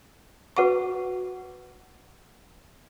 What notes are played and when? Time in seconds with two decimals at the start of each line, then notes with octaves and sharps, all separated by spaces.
0.57 F#4 B4 F#5 C#6 D6